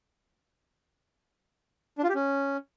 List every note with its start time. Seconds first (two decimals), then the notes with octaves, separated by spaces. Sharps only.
1.98 D4
2.04 F4
2.09 G4
2.15 C#4